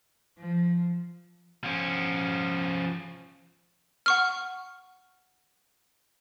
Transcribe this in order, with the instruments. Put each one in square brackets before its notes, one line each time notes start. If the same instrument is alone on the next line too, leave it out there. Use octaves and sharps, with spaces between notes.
[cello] F3
[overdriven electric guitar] F3 C#4
[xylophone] F#5 C#6 F6